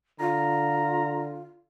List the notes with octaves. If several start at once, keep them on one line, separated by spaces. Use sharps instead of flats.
D3 F4 A#5